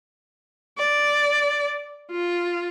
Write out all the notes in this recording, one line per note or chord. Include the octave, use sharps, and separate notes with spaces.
D5
F4